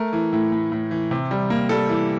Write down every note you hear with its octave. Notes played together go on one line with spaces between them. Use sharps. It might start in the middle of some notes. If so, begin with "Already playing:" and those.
Already playing: A3 A#4
E3
A2
A2
A2
E3
C3
G3
A#3
G3 A4
E3